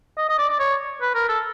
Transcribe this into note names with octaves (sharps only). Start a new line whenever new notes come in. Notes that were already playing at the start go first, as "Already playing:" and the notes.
D#5
D#5
D5
D5
C#5
B4
A#4
A4